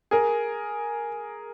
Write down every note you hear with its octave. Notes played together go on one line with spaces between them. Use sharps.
G#4 A#4